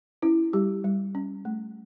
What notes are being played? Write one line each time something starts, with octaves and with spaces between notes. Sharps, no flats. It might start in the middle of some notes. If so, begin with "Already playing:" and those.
C#4 E4
G3 G4
G3
C#4
A3